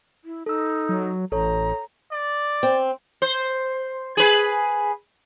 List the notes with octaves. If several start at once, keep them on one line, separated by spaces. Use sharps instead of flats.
E4
D#4 A4 E6
F#3
A1 A4 C#5 A#5
D5
C4
C5
G#4 B4